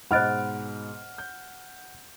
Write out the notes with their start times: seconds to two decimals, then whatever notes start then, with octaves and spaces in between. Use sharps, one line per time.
0.11 G#2 B2 C5 D#5 F#5 B5 F6 D7
1.18 G6